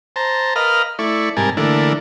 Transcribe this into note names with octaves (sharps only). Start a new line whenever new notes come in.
C5 A5 A#5
A#4 B4 D#5 F5 F6
A3 E4 D5 C#6
G#2 C3 G3 A#4 G#5 A5
D3 E3 A3 A#3 D4